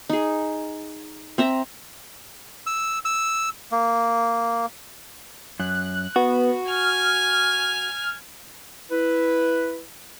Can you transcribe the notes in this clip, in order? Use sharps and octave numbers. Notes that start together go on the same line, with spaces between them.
D#4 G#4
C4 E5 A#5
E6
E6
A#3
F#2 F#6
B3 F#4
G#5 F6
E4 B4